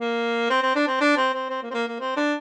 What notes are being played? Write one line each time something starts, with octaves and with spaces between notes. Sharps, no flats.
A#3
C4
C4
D4
C4
D4
C4
C4
C4
A#3
C4
A#3
A#3
C4
D4